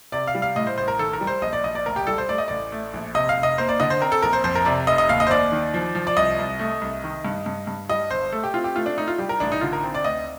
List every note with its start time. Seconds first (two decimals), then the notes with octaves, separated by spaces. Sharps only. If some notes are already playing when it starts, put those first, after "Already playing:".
0.12 C3 D5
0.27 F5
0.35 G3
0.42 F5
0.56 A2 D#5
0.67 C5
0.78 A1 C5
0.88 A#4
0.99 D#3 A4
1.13 A#4
1.21 G3
1.27 C5
1.42 A#1 D#5
1.53 D5
1.64 A#1 D#5
1.75 D5
1.85 D2 A#4
1.96 G4
2.07 G3 A4
2.18 C5
2.28 A3 D5
2.38 D#5
2.48 A1 D5
2.72 A3
2.94 A#1
3.15 C3 D#5
3.29 F5
3.37 F1
3.43 D#5
3.58 A#3 C5
3.69 D5
3.80 D3 D#5
3.90 C5
4.01 C4 A#4
4.12 A4
4.22 A#1 A#4
4.33 C5
4.44 F2 C5
4.55 A#4
4.65 C3 D5
4.87 F1 D#5
4.98 D#5
5.09 D#2 F5
5.20 D#5
5.27 C5
5.30 D#2 D5
5.52 D#3
5.74 F3
5.95 F3
6.07 D5
6.17 C2 D#5
6.39 C2
6.59 A3
6.82 C2
7.04 D#3
7.25 G2
7.46 G2
7.67 G2
7.89 G3 D#5
8.11 G1 C5
8.32 A3 A4
8.44 G4
8.54 C4 F4
8.64 G4
8.75 A3 F4
8.86 D4
8.98 A3 D#4
9.08 F4
9.19 G3 G4
9.29 A#4
9.40 A1 D4
9.52 D#4
9.61 D3 F4
9.73 A#4
9.83 C4
9.95 D5
10.04 D2 D#5